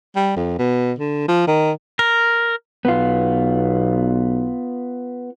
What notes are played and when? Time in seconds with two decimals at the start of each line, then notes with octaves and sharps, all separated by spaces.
0.16 G3
0.36 F2
0.59 B2
0.98 D3
1.28 F3
1.47 D#3
1.99 A#4
2.85 B1 B3 F4